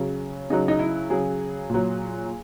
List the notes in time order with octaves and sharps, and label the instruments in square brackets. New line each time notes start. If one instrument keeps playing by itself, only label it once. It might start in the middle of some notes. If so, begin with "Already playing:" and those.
Already playing: [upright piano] C#3 F#3 C#4
C#3 F#3 D#4
D#4
E4
C#3 F#3 G#4
A#2 F#3